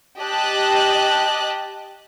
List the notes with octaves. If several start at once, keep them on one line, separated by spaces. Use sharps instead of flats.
G4 D#5 A5 F#6